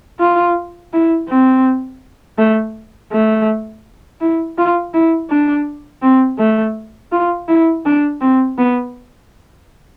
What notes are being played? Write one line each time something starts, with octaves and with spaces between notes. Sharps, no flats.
F4
E4
C4
A3
A3
E4
F4
E4
D4
C4
A3
F4
E4
D4
C4
B3